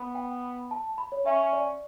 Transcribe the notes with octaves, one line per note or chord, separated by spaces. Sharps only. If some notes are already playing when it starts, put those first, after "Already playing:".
Already playing: B3
G5
A5
B5
C#5
C#4 E5
D5